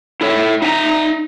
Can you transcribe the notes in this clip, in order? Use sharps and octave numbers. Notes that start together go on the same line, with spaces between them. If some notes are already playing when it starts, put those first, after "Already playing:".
E4 A4 C#5 E5
D#4 E5 G#5 A#5